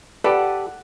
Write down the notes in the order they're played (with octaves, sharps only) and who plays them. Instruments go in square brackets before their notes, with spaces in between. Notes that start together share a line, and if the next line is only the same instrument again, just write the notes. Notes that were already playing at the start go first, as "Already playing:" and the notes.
[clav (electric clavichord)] G4 A4 [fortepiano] B4 D5 [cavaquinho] F#5